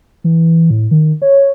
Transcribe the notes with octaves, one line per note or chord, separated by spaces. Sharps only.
E3
A2
D#3
C#5